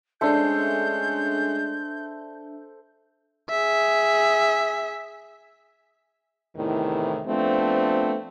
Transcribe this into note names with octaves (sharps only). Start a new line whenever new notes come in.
G#3 A3 C#4 D4 A4 C5 E5 G6
G#4 E5
E2 A2 C3 D#3 E3
F3 A3 B3 C4 D4